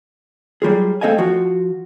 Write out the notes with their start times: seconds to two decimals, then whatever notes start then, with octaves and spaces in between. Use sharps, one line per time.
0.62 F#3 G3 F4 G#4
1.01 A3 C4 A4 D#5 F5 G#5
1.18 F3 F4 F#4